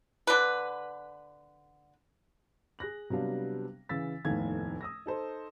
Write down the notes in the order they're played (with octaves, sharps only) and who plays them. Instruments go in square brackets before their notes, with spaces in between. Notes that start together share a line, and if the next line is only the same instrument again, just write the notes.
[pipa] D3 B4
[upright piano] G#4 F#6 A#6 F#7
C3 F#3 G3 B3 D4 F5
C#3 E3 F5 E6 A6 B6
F1 D#2 A2 B3 F5 G#6
D#6 E6 A#6
D#4 A4 C5